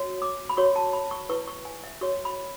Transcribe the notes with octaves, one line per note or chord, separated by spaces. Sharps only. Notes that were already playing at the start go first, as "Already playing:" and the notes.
Already playing: F#4 C#5
D6
B5
F#4 C#5 C#6
A5
B5
C#6
E4 B4 C#6
C#6
G#5
E5
F#4 C#5 C#6
B5